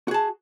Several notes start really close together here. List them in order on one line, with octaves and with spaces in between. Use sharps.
F#4 G#4 A5